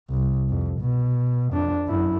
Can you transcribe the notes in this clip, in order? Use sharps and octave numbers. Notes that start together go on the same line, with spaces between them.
C2
F2
B2
F2 D4
F#2 E4